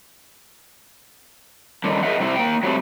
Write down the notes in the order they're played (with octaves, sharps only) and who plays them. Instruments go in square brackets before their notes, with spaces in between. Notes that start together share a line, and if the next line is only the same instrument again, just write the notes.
[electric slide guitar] D3 D#3 G3
G#4 A#4 D#5 E5 F#5
C3 G3 C4 E4
A#3 G5
F#3 G3 A3 C4